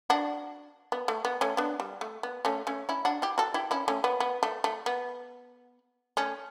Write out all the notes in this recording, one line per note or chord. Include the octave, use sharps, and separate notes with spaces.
D4 F#4
B3
A3
B3
A3 C#4
B3 D4
G3
A3
B3
A3 C#4
A3 C#4
C#4 E4
D4 F#4
E4 G4
F#4 A4
E4 G4
C#4 E4
A3 C#4
B3
B3
A3
A3
B3
A3 C#4